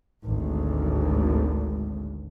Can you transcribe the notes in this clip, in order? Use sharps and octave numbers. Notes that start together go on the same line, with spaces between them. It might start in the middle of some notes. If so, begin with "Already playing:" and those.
G#1 D2